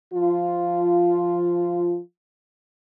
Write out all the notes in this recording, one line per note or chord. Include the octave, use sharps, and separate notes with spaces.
F3 F4